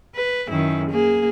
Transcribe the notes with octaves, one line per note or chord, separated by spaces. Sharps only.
B4
F#2 D#3 E4
A#3 G#4